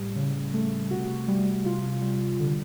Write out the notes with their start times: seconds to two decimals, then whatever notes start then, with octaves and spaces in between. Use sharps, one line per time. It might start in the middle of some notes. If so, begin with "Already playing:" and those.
Already playing: A2 G3
0.16 C#3
0.53 A3
0.91 C3 F#4
1.28 G3
1.65 C3 F4
2.02 G3
2.40 D3